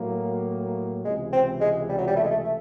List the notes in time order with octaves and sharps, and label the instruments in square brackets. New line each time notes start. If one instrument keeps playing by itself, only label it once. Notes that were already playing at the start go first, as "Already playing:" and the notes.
Already playing: [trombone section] A2 F#3 A#3
[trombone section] C#2 C3 E3 [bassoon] G#3
[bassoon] C4
G#3
G3
F#3
G3
A3
G#3
A3
A3